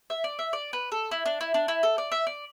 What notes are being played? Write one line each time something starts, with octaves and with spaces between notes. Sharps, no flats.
E5
D5
E5
D5
B4
A4
E4
D4
E4
D4
E4
A4
D5
E5
D5